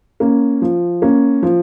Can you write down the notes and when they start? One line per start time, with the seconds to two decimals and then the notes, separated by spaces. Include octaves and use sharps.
0.20 A#3 C#4
0.62 F3
1.02 A#3 C#4
1.43 F3